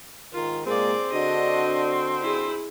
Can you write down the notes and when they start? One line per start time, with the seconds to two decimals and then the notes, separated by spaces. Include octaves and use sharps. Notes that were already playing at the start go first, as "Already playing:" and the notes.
0.34 G#2 D#3 F4 A#4
0.66 A#2 G#3 A#3 C4 G#4 D5
1.12 D3 D4 F#4 D#5
2.22 E4 G#4